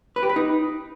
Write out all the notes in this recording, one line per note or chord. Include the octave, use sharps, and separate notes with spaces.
B4
G4
B4
D#4